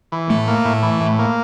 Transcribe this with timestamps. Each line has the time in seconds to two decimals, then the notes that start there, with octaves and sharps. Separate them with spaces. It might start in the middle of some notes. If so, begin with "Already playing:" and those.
0.12 E3
0.29 A2 A3
0.48 A#3
0.65 A2
0.83 E3
1.01 A2
1.19 A#3